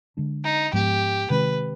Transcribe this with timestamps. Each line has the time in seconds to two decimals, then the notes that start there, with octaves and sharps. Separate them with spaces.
0.17 D3 G#3 D4
0.44 D#4
0.73 G#2 F3 G#3 B3 G4
1.30 C3 D#3 G#3 C4 B4